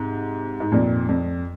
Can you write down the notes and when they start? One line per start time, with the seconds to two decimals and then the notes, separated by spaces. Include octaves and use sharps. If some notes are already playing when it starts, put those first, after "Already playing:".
Already playing: G#2 C3
0.60 G#2
0.72 F2 A#2
1.08 F2